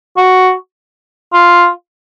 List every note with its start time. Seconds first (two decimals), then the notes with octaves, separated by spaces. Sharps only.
0.17 F#4
1.33 F4